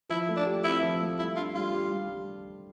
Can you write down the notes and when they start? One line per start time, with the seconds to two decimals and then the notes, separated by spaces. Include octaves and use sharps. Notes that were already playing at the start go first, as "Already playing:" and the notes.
0.09 F3 E4
0.29 A3
0.37 D4
0.46 G4
0.64 C4 E4
0.82 F3
1.00 A3
1.19 G3 E4
1.36 D4 F4
1.55 G3 F4
1.73 G4
1.91 G3